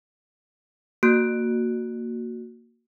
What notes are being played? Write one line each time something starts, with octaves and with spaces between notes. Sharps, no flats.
A#3 F#4 F#6 D7